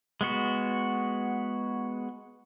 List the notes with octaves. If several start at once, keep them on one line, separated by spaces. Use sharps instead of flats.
G#3 B3 F#4